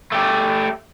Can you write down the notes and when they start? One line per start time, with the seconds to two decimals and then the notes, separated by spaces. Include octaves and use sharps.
0.12 A3 G4